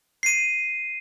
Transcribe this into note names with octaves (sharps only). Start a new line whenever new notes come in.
C7 D#7